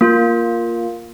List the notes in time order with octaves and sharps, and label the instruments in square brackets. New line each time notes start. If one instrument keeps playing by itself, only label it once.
[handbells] A#3 F4